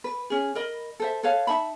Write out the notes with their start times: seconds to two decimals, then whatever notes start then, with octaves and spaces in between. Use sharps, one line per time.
0.04 B4
0.30 C#4 G#4
0.55 A#4 D#5 B5
1.00 A4 C5 E5
1.23 A4 B4 C#5 F5
1.47 D#4 E5 A5 B5